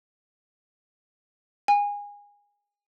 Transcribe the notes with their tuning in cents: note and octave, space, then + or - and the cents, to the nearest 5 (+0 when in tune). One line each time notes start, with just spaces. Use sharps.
G#5 -25